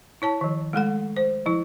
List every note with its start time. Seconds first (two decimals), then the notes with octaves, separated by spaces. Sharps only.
0.22 E4 C#5 A5
0.41 D#3 F3
0.73 G#3 A3 A4 F#5
1.17 C5
1.46 F3 E4